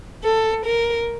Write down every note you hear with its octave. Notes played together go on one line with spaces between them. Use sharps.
A4
A#4